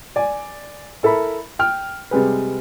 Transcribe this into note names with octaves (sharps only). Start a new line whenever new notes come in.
D5 G#5
E4 A4 A#4 B5
G5 F6
C3 G3 G#3 G#4 B4